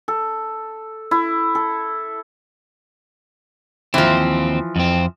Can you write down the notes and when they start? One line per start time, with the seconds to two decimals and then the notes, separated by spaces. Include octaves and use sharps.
0.08 A4
1.11 E4
1.55 A4
3.94 D#2 E3 F3 C4
4.76 F2 C4